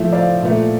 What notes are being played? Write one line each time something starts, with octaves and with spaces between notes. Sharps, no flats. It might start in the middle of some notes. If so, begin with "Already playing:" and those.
Already playing: A2 F3 A3 C5 E5
D5 F5
A#2 A3